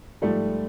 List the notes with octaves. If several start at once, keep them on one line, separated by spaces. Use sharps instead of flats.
G#2 F3 G3 A3